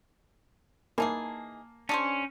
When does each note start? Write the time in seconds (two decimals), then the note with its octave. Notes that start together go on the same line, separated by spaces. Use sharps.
0.98 E3 A#3 D#4 G#4 G#5 A5
1.89 C#4 D4 G#4 C5